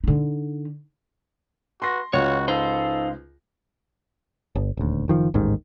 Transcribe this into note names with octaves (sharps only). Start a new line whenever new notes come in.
D3 D#4
F#4 B4 C6 A#6
C#2 F4 F#4 C#5
D#4 A4 C5 F5
G1
D#1 D2
F#1 D#3 F3
A1 D#2 G#2 D#3